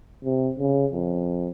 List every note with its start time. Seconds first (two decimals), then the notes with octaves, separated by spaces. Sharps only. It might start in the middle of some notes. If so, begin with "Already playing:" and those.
0.25 C3
0.59 C#3
0.93 F2